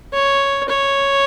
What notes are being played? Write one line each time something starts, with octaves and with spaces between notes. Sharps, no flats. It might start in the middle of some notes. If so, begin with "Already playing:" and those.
C#5
C#5